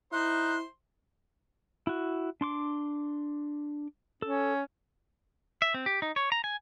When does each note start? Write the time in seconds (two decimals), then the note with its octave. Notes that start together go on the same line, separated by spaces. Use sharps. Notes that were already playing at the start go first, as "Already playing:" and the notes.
0.12 D#4 E4 C5 C6 F#6
1.87 E4 F#4
2.41 D4 C6 D6
4.22 C#4 A4
5.62 E5
5.74 C4
5.86 G4
6.02 D#4
6.16 C#5
6.32 A#5
6.44 G#5